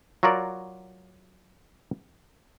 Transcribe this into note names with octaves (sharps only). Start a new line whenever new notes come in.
F#3 F4 F#4 A#4 D5